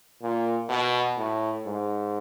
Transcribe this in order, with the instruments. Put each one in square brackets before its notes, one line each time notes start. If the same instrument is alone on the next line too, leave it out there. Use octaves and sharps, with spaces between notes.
[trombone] A#2
B2
A2
G#2